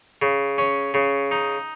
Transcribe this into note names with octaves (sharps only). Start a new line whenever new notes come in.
C#3
C#4
C#3
D#4